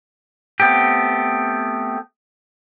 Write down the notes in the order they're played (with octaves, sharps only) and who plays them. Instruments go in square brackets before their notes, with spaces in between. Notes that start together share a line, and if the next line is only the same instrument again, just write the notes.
[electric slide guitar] A3 B3 C4 G4